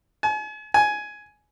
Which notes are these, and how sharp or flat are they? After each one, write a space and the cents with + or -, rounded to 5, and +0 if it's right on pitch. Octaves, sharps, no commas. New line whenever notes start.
G#5 +40
G#5 +10